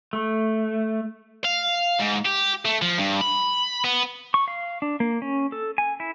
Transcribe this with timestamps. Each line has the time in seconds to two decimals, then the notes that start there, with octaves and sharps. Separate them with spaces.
0.13 A3
1.44 F5
2.00 G#2
2.26 G4
2.65 A3
2.82 F3
2.98 G2
3.21 B5
3.84 B3
4.34 C#6
4.48 F5
4.82 D4
5.00 A#3
5.22 C#4
5.52 A4
5.78 G#5
6.00 E4